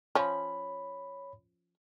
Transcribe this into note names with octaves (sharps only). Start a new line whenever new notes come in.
F3 C#4 C#5 B5